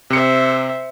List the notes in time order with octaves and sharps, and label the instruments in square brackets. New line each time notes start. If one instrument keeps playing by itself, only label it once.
[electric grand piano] C3 C#7 [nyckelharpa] C5 E5